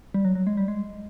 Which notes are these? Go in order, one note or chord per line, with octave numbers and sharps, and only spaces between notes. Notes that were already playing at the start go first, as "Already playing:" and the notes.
G3
F#3
F#3
G#3
G3
G#3